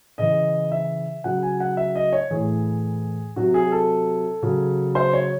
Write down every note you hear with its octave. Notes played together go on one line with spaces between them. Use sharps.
C#3 E3 D#5
E5
C#3 F#3 F#5
G#5
F#5
E5
D#5
C#5
A2 E3 G#4
C3 F#3 F#4
G#4
A4
C#3 F#3
C5
C#5